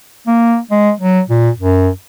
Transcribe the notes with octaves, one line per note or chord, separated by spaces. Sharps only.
A#3
G#3
F#3
A#2
F#2